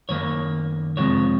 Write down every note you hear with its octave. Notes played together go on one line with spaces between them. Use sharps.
F#2 D#3 A#3 C#5
F2 C3 F3 G#3 C#5